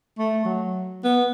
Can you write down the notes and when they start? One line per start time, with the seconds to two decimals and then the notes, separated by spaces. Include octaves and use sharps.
0.18 A3
0.45 F#3
1.04 B3